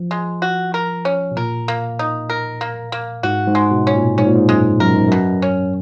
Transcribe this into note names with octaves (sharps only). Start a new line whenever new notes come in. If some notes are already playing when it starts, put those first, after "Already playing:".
Already playing: F3
G#3
F#4
A#4
C#4
B2
A#2 A#4
A#3
D#4
A#4
A#3
A#3
G#2 F#4
G#2
G#3
B2
C#4
A#2
G#2 C#4
A#2
G#2
F#2 G#3
F#2 A#4
G#2
F#2 B2
C#4